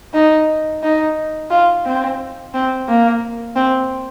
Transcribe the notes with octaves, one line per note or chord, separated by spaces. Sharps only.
D#4
D#4
F4
C4
C4
A#3
C4